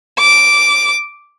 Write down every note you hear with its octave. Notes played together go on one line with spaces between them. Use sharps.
D6